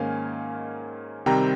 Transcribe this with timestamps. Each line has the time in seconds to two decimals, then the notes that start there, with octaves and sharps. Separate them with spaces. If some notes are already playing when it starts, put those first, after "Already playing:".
Already playing: G#2 D#3 A#3 C#4 F5 G#5
1.26 C3 D#3 G3 C4 G5 A#5